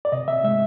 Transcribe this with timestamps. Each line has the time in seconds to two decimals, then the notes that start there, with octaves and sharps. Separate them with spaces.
0.05 D5
0.12 C3 D#5
0.28 C3 E5
0.44 G#3 E5